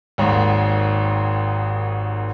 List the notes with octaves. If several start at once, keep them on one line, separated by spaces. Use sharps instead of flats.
G#1 D#2 G#2